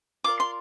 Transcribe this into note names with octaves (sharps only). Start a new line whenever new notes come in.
F4 A#4 D5 D6
C6